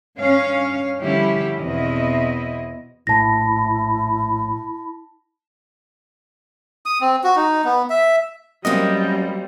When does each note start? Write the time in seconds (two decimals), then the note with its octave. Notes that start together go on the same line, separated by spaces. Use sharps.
0.19 G2 C#4 C#5 F5
1.00 D3 F3 G3 C#4 E4 G4
1.60 E2 B2 C4 E4 D#5
3.07 A#1 A2 E4 A5 A#6
6.86 D#6
7.01 C4
7.24 F#4
7.36 D#4
7.65 B3
7.90 E5
8.65 F#2 G3 G#3 A#3 C4 D#5